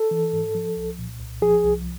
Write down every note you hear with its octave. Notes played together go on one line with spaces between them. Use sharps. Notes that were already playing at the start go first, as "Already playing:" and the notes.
Already playing: A4
E3
G#2
F3
C2
A#2
C2
F3 G#4
C2